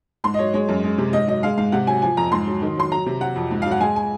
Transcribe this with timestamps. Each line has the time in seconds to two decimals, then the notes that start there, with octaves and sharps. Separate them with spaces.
0.24 G#2 C6
0.34 D#5
0.39 F#3 C#5
0.53 G#3 C#5
0.69 F#2
0.83 G#3
0.98 C3
1.13 G#2 D#5
1.28 F#3 D#5
1.43 G#3 F5
1.58 G#2 F5
1.72 C3 F#5
1.87 F#3 G#5
2.02 F3 G#5
2.17 F2 A#5
2.32 G#2 C6
2.47 F#3
2.62 D#3
2.77 F#3 C6
2.92 F#3 A#5
3.06 C3
3.21 F#3 F#5
3.36 F2
3.51 G#2
3.62 F#3 F5
3.71 F#5
3.81 G#3 G#5
3.96 G#5